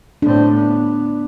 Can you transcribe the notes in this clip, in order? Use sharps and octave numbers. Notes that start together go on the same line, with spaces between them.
A2 C4 D4
B3